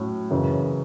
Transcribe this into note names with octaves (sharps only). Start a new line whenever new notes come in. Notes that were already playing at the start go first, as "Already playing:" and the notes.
Already playing: A2 F#3 C#4
F#2 C#3 E3